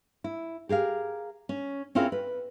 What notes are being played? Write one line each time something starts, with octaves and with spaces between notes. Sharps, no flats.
E4
G4 G#4 A#4 F5
C#4
C4 C#4 E4 F4 G#4 A#4
B4